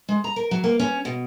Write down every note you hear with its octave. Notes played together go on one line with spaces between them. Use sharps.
G#3
A#5
A#4
F#3
A#3
C#4
B2